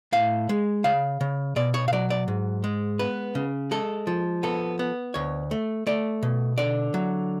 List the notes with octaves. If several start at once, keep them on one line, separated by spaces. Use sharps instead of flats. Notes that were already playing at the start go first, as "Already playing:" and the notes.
A2 F5
G#3
C#3 F5
C#3
B2 D5
C#5
F5
F#3 D5
D5
G#2
G#3
B3 B4
C#3
G#3 A4
F3
B3 A4
B3
D2 C#5
A3
A3 D5
B2
D3 D5
F#3